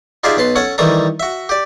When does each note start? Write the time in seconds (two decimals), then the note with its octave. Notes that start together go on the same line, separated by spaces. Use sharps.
0.24 D#4 F4 G4 G#4 D5 E5
0.37 B1 B4 A5 C6
0.56 C#4 A4 C#5 F#5
0.78 D#3 E3 G3 A4 A#5
1.20 F#4 E5
1.49 G4 D5